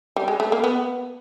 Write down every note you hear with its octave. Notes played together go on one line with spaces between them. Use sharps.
G3
G#3
A3
A#3
B3